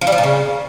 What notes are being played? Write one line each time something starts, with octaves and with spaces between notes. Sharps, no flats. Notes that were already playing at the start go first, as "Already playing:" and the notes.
F3
G3
F3
A#2
C#3